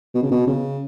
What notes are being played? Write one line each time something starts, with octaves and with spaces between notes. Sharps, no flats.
B2
C#3
B2
C#3